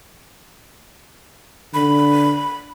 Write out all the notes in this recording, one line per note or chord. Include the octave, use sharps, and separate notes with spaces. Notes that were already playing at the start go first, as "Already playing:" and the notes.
D3 B5